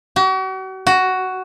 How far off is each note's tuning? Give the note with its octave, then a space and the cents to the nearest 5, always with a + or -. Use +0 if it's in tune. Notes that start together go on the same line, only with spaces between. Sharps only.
F#4 +40
F#4 +10